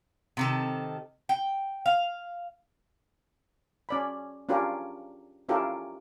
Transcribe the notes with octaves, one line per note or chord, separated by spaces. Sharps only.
C3 D#3 A4
G5
F5
C#4 D5 B5
C#4 D4 F4 G4 A#4
C#4 E4 F4 G4 A4 A#4